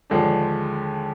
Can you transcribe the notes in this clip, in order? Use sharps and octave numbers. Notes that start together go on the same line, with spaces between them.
D#2 D3 F3 G#3 D4